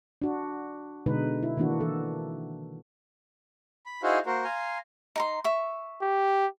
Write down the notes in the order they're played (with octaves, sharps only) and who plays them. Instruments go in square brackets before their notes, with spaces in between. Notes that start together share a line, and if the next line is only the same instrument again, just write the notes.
[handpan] D4 F#4
B2 D3 G#3 D#4 B4
E4
D#3 E3 A#3 D4 F#4
E3 A4
[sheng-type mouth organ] B5
D#4 E4 F#4 G#4 C5 F5
A#3 F#4 A#4 C5
F5 G#5 A#5 C6
[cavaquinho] D#4 A#5 C6
E5 C#6
[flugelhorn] G4